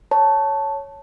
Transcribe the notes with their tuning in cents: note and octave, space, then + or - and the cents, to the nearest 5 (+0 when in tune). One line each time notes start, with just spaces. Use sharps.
C#5 +0 A5 +0